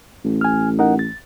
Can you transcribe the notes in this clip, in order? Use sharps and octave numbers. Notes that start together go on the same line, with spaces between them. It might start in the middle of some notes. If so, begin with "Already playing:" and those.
A1
G#5 F6
D#4 A#4 F#5
A6